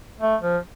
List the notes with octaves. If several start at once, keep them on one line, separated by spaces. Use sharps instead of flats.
A3
F3